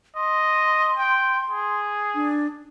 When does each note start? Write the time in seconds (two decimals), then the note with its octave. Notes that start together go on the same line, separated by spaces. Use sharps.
0.16 D#5 C6
0.97 G5
1.50 G#4
2.15 D4